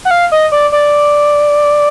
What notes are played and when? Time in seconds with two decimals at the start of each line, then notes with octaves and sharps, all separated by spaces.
0.05 F#5
0.11 F5
0.32 D#5
0.52 D5
0.72 D5